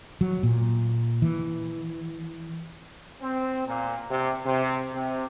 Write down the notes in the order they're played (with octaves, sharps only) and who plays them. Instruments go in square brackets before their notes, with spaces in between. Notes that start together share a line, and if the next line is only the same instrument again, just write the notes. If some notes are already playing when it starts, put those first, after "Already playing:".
[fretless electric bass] F#3
A#2
E3
[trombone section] C4
A#2
C3
C3
C3